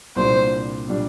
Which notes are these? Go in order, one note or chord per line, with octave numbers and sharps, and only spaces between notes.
C2 A#2 G3 D4 C5
A#2 G3 D4